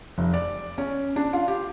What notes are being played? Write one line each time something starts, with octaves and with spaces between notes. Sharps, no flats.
F1
D5
C#4
D4
F4
G4